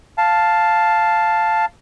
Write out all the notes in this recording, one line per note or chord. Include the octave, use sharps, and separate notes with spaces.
F5 A5